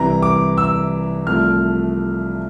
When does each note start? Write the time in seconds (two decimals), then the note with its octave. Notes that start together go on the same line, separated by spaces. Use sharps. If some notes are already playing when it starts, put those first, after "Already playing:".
Already playing: C2 C3 E3 A#5
0.22 D6
0.58 E6
1.26 C2 C3 F3 A3 F6